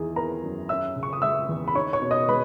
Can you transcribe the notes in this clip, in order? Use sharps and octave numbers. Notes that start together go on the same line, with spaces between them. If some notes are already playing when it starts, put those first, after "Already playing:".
Already playing: E2 E3 D#4 G#4
B3 A#4 A#5
F#2
C#4 E5 E6
C#3
C#6
D#6
G#3 E5 E6
E2
B5
D#4 C#5 C#6
C#5 C#6
B2
D#5 D#6
G#3 B4 B5